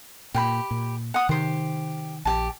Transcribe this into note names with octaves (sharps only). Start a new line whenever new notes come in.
A#2 G4 G5 B5
A#2
F#5 D#6
C3 D#3 G4 C5
A#1 G4 A5